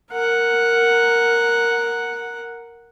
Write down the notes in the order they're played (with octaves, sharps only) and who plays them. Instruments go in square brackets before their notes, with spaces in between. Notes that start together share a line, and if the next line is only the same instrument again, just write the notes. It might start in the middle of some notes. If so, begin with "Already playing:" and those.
[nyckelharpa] A#4 F#5